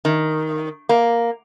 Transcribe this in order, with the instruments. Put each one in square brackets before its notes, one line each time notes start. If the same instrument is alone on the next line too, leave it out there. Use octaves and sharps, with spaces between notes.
[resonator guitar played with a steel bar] D#3
A#3